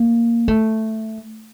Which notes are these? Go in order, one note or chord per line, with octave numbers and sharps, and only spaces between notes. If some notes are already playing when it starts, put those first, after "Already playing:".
Already playing: A#3
A3